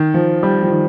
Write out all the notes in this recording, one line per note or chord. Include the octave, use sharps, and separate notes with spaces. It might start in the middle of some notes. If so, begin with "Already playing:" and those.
Already playing: D#3
F3
G3
F3
D#3